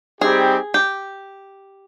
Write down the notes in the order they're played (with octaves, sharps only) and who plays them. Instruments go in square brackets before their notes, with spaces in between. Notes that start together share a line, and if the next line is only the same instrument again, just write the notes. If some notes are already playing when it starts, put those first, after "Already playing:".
[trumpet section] G3 C4 D#4 G4 [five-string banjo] G#4
[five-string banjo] G4